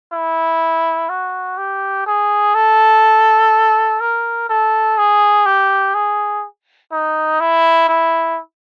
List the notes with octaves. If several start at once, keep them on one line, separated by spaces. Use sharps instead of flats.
E4
F#4
G4
G#4
A4
A#4
A4
G#4
G4
G#4
D#4
E4
E4